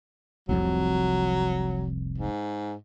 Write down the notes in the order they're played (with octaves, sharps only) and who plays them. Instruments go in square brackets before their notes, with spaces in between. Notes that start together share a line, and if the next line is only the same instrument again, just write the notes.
[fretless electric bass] F1 C2 F2 [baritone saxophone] F#3
[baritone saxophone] G#2